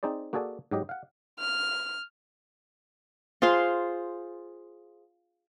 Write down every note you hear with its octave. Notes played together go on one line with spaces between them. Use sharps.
C4 D#4 G#4 C5 D5
A#3 F#4 G#4 A4 D5 G#5
G#2 F#3 G4 D#5
F5 F#5
F6
F4 G#4 C5 F5